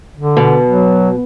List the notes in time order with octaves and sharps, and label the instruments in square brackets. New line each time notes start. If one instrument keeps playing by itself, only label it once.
[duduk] D3
[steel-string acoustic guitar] B2
[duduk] F#3